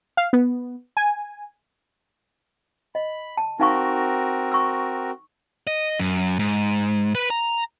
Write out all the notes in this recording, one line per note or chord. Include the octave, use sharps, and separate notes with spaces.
F5
B3
G#5
D#5 B5
A5
C4 D#4 F#4 A#4 F5 C#6
C#6 E6
D#5
F#2
G#2
B4
A#5